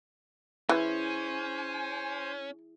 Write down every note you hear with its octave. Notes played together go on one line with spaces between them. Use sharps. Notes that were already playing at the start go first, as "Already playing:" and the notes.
E3 C#4 E4 G#4 C5 G#5